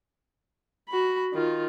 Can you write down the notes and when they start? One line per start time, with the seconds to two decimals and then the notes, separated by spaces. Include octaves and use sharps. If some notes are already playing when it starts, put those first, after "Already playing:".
0.89 F#4 B5
1.33 D#3 F4